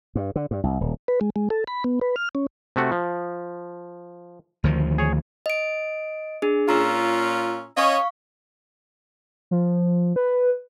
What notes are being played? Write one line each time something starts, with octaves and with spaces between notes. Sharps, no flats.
G2
D3
G2
C2
D#1
B4
G#3
G#3
A4
B5
B3
B4
F6
C#4
C3 A3 F#4
F3
D2 D#3 F3
G#4 C#5
D#5 D7
D4 G#4
A#2 C#4 F4 A#5 E6
C#4 C#5 D#5 F5 C#6
F3
B4